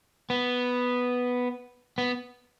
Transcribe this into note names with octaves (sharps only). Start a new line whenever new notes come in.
B3
B3